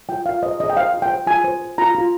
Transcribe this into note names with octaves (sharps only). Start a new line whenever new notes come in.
F4 G5
F4 F5
C5 D#5
G#4 D#5
G5
C5 F5
F4
G5
C5
F4 G#5
C5
C5
F4 A#5
F4